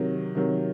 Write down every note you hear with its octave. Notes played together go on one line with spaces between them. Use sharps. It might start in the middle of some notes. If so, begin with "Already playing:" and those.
Already playing: C3 D#3 F#3
C3 D#3 F#3